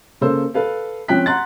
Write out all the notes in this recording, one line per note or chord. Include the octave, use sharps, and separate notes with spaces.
C#3 A#3 A4 C5 E6
A4 B4 F5
F3 C4 C#4 G5 F#6 B6
F#5 A#5 C6 F#6 A6